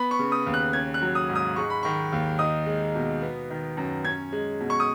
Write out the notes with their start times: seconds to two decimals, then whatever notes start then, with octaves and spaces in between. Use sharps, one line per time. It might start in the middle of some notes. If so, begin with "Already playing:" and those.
Already playing: B3 B5
0.11 C#6
0.19 C#3
0.32 D#6
0.46 D#2
0.54 F#6
0.73 C#4 G#6
0.94 F#6
1.02 F#3
1.15 D#6
1.29 G#2
1.35 D#6
1.56 G#3 C#6
1.70 B5
1.83 D#3 C#6
2.12 D#2
2.39 D#4 D#6
2.66 G#3
2.95 B2
3.22 B3
3.50 D#3
3.77 F#2
4.05 C#4 G#6
4.32 G#3
4.60 B2
4.70 C#6
4.80 D#6